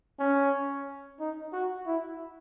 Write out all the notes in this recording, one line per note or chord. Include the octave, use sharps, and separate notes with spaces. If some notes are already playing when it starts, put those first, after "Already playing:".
C#4
D#4
F#4
E4